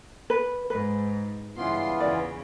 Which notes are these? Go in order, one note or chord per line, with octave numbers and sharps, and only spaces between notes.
B4
G#2 B4
G2 C#3 E3 B3 F4 C6
E2 C#3 D5